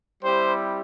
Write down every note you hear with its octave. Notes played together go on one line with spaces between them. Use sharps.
G3 C4 E4 G4 C5